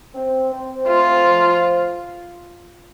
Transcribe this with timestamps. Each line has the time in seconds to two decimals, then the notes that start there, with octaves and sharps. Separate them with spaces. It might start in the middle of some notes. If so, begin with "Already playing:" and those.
0.15 C4
0.51 C4
0.88 A3 F4
1.23 F3